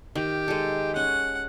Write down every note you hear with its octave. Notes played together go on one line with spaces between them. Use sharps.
D#3 G4
G#3 A4
C#4 F#5